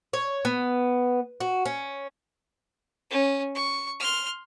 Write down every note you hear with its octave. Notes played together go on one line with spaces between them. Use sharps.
C#5
B3
F#4
C#4
C#4
C#6
C6 F6